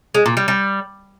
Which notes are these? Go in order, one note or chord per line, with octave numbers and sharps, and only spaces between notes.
G#3
A#2
G3
G3